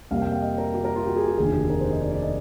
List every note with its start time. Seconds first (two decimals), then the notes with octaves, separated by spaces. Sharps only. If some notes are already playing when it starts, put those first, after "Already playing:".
0.11 F2 C3 G3 A#3 F5
0.22 G5
0.32 F5
0.42 D#5
0.58 A#4
0.74 G4
0.85 A#4
0.96 F4
1.06 G4
1.16 G#4
1.27 G4
1.38 F1 D#2 D3 G#4
1.54 G4
1.70 A#4
1.80 C5
1.91 D#5
2.01 D5
2.12 D5
2.22 D#5